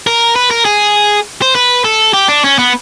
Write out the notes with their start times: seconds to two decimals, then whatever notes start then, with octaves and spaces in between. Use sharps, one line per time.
0.07 A#4
0.36 B4
0.51 A#4
0.65 G#4
1.42 C5
1.55 B4
1.84 A4
2.13 G4
2.28 D4
2.44 C#4
2.58 B3